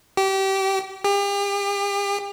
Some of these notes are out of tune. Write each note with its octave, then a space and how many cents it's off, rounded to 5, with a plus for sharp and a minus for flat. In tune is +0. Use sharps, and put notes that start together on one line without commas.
G4 -25
G4 +40